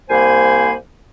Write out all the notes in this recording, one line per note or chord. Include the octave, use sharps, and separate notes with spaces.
C2 A#3 C5 G#5 B5